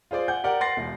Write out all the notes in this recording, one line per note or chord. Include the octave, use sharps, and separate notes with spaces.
F4 G#4 C5 D5
F#5 G#5 G6
G4 A#4 D5 F#5
F#5 C6 A6 A#6 C7
E1